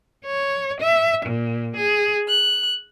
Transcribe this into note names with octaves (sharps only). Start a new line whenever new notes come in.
C#5
E5
A#2
G#4
F#6